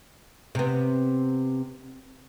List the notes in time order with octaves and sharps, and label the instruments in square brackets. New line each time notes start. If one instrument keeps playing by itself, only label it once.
[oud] C3 B3